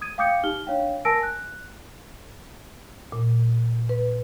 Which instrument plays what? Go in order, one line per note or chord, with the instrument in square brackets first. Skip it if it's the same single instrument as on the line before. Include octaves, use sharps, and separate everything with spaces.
[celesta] D#6 G#6 D#7
F5 G5 D6 D#6 G6 C#7
D#4 G4 F6 G7
D4 C#5 F5 G5
A#4 G#5 A5 E6 A#6 D7
F#6
[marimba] A#2
B4